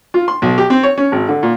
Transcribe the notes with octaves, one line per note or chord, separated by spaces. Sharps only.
F4
C6
B1
G4
C4
C#5
C#4
G#1
D3
A#2